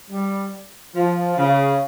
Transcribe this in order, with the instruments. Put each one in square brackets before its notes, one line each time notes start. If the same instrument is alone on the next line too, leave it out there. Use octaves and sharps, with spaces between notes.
[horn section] G3
F3
C#3